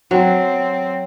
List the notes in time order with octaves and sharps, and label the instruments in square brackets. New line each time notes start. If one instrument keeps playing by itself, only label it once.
[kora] F#3 [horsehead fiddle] C4